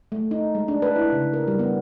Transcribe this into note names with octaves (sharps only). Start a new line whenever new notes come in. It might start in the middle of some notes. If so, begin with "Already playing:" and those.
A3
D#4
G#3
D4
B4
E4
C#3
A#4
G3
B3